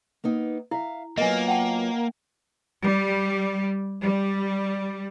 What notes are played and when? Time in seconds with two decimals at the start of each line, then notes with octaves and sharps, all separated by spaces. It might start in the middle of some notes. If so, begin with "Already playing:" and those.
0.24 A#3 B3 D#4
0.71 E4 E5 F5
1.18 F#3 A#3 B3 F4 D#5 G#5
1.48 F#5 G5 A5
2.83 G3
4.01 G3